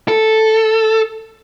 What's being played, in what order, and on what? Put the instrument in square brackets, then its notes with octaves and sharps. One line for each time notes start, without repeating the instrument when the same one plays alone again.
[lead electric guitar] A4